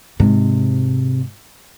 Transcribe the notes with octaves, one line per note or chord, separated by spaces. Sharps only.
G#2 C3